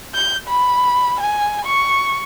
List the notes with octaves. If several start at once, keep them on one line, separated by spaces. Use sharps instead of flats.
G6
B5
G#5
C#6